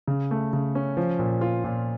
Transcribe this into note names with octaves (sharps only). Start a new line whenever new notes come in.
C#3
A3
C#3
C#4
F3
A#2
F4
A#2